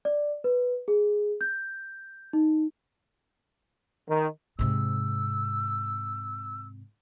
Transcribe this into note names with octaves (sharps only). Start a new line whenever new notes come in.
D5
B4
G#4
G6
D#4
D#3
G#2 C3 E6